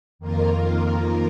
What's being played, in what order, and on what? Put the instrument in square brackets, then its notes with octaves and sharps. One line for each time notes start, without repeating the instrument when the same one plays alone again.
[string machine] F2 D#3 A#3 F4 A#4